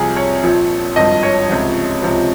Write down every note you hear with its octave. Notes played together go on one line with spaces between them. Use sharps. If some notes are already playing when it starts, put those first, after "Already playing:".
Already playing: C2 C3 F3 G#4
C#5
A#1 A#2 F3
G#1 G2 F3 D#5
C#5
C#2 C3 F3
C#2 C3 F3